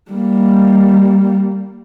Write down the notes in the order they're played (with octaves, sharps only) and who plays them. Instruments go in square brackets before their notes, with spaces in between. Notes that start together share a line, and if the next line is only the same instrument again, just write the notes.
[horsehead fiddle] G3 A#3